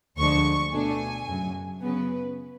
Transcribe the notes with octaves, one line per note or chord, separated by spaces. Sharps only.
D2 D3 F3 G#3 D4 C#6
B2 A3 D4 G#5
F#2 C#3 F#3
C#3 F#3 B3 B4